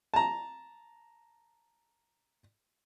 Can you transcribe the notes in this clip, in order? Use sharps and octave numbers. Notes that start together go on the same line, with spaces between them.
A5 A#5